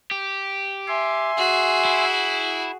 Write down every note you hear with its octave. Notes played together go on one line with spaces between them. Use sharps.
G4
E5 G#5 C6
F#4 G#4
E4